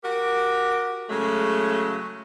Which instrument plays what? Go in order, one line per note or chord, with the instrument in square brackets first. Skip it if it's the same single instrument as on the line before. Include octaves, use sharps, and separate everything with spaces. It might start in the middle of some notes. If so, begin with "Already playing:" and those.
[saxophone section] F#4 G4 A#4
C#3 F#3 G#3 A3